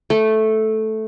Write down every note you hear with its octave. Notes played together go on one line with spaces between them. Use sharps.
A3